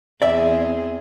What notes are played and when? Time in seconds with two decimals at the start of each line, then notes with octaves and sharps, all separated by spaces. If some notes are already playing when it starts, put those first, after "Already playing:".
0.22 E2 C4 G#4 D5 E5